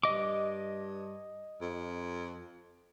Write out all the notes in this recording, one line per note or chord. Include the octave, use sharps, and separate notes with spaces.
G2 D#5 D6
F2